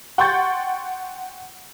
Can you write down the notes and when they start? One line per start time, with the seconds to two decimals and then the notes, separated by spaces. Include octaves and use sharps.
0.18 F#5 G5 C6 C#6 G6 A6